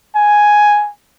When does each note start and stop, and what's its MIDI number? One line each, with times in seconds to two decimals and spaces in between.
0.16 0.90 80